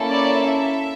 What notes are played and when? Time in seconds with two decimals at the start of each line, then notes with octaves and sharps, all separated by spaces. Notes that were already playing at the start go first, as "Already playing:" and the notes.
Already playing: A#3 C#4 E4 A4
0.10 D5
0.39 E5